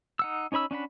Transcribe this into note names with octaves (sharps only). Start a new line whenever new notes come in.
D#4 F#5 E6
C#4 D#4 C#5 B5 E6
C#4 D4 F#5 B5